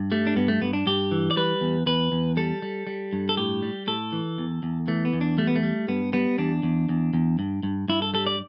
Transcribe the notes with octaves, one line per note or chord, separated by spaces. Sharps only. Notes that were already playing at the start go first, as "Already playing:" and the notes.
Already playing: G2
G3 A3
D4
G2 B3
A3
G2 B3
D4
G2 G4
E3
D5
G3 B4
E2
E2 B4
E2
G3 A4
G3
G3
G2
A4
A2 G4
G3
A2 A4
E3
E2
E2
E3 A3
B3
E2
D4
G3 A3
B3
A3
G3
G2 B3
G3 B3
E2 D4
E2
E2
E2
G2
G2
G2 E4
A4
G3 A4
D5